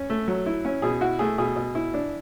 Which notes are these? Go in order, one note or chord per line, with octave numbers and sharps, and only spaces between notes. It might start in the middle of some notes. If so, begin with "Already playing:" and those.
Already playing: C#4
A3
F#3
E4
C#4
B2 G#4
E4 F#4
A3 G#4
B2 G#4
B2
E4
D4